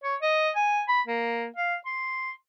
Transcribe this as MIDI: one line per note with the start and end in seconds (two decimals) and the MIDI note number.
0.04 0.16 73
0.22 0.50 75
0.56 0.83 80
0.89 1.02 83
1.07 1.47 58
1.56 1.75 77
1.86 2.31 84